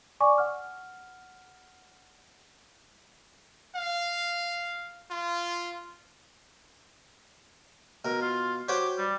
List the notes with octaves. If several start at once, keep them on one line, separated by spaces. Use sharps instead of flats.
D5 G#5 C#6 D6
F#5 F6
F5
F4
B2 A#4
F4
F#4 G4 C5 C#5
G3